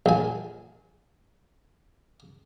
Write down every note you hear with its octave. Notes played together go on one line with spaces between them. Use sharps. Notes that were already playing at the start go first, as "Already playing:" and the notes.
A#1 G#5